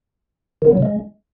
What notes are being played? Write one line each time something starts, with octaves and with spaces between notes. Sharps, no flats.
D#3
B3
F#3
C#3
G#3